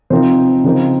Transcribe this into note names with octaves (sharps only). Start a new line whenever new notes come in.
C3 F3 C4 D#4 C5
C#3 F3 C4 D#4